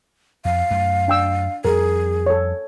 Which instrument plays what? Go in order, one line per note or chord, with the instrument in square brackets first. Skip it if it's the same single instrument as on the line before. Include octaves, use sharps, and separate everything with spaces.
[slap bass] F2 [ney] F5
[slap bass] F#2 A3
[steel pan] D4 G5 E6
[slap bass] F2 G3 [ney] G#4 [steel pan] A#4
[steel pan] A4 C#5